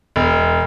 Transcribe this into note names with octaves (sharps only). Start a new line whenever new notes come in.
E1